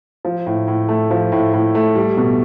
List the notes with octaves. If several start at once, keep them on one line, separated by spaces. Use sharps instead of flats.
F3
A2
A2
A3
F3
A2
A2
A3
G3
B2